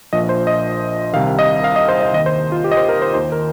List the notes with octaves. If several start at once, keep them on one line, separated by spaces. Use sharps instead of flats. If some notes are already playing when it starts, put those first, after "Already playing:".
A#1 A#2 F3 D#5
C5
D#5
C2 C3 D#3 F5
D#5
F5
D#5
C5
D#5
D#2 D#3 D#5
C5
F4
G4
D#5
C5
A#4
C5
D#2 D#3 C5
A#4